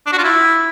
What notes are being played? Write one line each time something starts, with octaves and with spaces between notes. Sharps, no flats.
D4
F#4
F4
E4